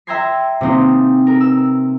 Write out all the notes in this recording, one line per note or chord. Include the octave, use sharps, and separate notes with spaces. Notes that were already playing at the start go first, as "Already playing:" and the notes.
E5 G5 A#5 C6 G#6 C7
C3 A#3 C4 D#4
A#4
E6